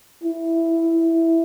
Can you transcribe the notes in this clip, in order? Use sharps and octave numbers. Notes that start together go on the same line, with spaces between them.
E4